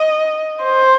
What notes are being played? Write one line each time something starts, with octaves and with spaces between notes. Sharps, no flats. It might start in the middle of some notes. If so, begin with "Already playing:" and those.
Already playing: D#5
C5